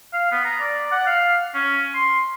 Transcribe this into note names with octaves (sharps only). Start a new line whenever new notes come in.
F5
B3
A#5
D5
F#5
F5
C#4
C6